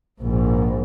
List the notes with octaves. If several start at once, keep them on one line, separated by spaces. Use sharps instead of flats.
A#1 G#2